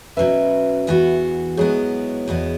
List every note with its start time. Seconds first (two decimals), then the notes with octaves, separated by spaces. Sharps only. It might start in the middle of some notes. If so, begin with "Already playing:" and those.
0.17 B2 F#3 C#4 B4 E5
0.87 E2 E3 B3 F#4
1.57 G#2 F#3 B3 E4 G#4 C#5
2.28 E2 B2 B3 E4